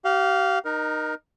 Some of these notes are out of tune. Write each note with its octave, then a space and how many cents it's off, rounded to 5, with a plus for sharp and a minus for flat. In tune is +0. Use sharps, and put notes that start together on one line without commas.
G4 -35 F5 +0
D#4 -15 A#4 +15